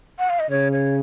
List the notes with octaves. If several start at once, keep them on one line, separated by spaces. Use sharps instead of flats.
F#5
F5
D#5
C#3 C#5
C#5